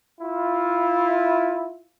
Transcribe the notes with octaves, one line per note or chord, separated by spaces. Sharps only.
E4 F4